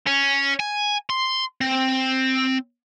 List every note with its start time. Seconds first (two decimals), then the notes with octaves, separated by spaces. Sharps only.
0.07 C#4
0.60 G#5
1.10 C6
1.61 C4